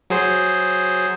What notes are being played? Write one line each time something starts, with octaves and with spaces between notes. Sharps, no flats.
F#3 G#4 C5